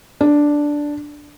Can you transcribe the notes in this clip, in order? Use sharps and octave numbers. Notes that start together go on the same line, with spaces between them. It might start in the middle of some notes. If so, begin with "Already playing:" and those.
D4